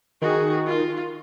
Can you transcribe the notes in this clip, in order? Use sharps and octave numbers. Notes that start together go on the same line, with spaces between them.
D#3 F#4 G#4
F4